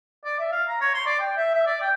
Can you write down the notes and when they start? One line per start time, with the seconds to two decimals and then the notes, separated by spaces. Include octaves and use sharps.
0.25 D5
0.39 E5
0.52 F5
0.69 A#5
0.81 C#5
0.95 C6
1.06 D5
1.20 G5
1.37 E5
1.54 E5
1.66 D5
1.81 G5